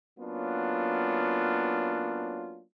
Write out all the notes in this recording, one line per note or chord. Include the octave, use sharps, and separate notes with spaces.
F#3 A#3 B3 C#4 D4 F4